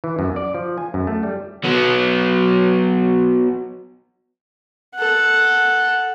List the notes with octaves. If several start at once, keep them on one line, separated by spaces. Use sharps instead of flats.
E3
F#2
D5
F3
G#5
F#2
A3
G3
F#3 B3
A4 F#5